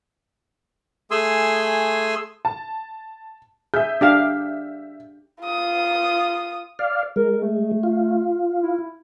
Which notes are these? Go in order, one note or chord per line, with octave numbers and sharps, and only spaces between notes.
A3 G#4 G#5 C6 E6
A5
G#4 E5 G6
D4 G4 F5
F4 D#6
D5 F5
G#3 A#4
A3
F4
E4